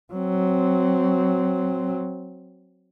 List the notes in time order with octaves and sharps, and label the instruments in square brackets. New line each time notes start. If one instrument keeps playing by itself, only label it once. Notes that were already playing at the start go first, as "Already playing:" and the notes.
[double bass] F#3 C4